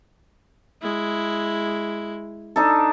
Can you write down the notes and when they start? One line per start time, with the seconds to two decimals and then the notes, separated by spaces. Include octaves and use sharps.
0.82 G#3 E4
2.56 D4 D#4 A4